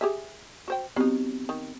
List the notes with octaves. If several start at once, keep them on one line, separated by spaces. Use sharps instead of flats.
G4 G#4 E5
F#4 C5 G5
F#3 B3 C4 D#4 G4
D#3